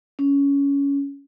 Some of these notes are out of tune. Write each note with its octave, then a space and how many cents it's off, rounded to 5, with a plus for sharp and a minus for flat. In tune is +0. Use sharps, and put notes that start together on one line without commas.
C#4 +15